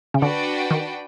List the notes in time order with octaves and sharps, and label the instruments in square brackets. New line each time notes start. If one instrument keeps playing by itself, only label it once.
[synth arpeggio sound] C#3
[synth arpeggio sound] D3 [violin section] D4 F#4 B4 D5 G5
[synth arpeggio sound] D#3